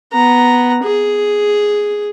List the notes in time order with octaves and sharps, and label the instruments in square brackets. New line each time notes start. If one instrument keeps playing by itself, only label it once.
[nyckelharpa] B3 A#5
G#4